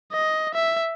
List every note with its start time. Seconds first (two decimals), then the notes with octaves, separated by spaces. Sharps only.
0.12 D#5
0.54 E5